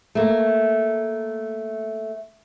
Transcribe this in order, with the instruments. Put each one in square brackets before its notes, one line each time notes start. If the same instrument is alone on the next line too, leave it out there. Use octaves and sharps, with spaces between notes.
[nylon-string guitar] A3 A#3